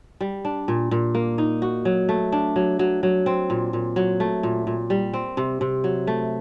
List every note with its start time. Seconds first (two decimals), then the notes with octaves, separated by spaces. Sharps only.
0.21 G3
0.45 D4
0.68 A#2
0.91 A#2
1.15 A#3
1.38 D#4
1.62 F#4
1.85 F#3
2.09 A3
2.32 D4
2.56 F#3
2.79 F#3
3.03 F#3
3.26 C4
3.50 A#2
3.73 A#2
3.96 F#3
4.20 A3
4.43 A#2
4.67 A#2
4.90 G3
5.13 C4
5.37 C3
5.61 C3
5.84 F#3
6.07 A3